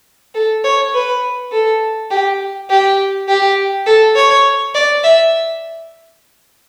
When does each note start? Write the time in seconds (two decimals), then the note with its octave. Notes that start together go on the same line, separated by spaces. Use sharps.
0.35 A4
0.64 C#5
0.94 B4
1.52 A4
2.11 G4
2.70 G4
3.28 G4
3.86 A4
4.16 C#5
4.75 D5
5.04 E5